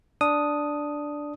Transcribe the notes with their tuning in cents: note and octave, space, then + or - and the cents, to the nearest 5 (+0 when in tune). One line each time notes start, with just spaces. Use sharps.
D4 +0 D#6 +0